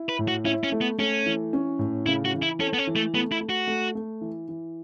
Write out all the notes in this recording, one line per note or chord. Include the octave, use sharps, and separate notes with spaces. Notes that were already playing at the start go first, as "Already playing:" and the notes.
Already playing: E4
B4
A2
F#4
C#4 E4
C#4
A3
B3
A3 C#4
E3
C#4
A2
C#3 E4
F#4
E3
E4
C#4 A4
B3
C#4
E3
A3
A3 B3
E4
A3
F#4
A3
A3
E3
E3